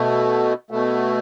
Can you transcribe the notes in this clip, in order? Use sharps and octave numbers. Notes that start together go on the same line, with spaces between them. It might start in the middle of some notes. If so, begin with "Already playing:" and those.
Already playing: B2 A3
B2 A3